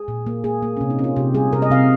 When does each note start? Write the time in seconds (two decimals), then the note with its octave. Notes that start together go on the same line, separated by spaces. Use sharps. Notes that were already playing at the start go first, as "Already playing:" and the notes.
Already playing: G#4
0.08 A#2
0.26 A#3
0.44 A#3 G#4
0.62 A#3
0.77 C3 C#4
0.90 D#4
0.99 C#4
1.04 F4
1.16 C3 G4
1.34 G3 G#4
1.53 C3 A#4
1.62 D#5
1.70 C3 F5